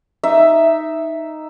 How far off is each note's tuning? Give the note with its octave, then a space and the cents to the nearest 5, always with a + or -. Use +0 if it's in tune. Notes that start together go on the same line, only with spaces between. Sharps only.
D#4 +0 E5 +0